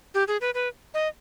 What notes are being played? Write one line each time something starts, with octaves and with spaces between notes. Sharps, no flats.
G4
G#4
B4
B4
D#5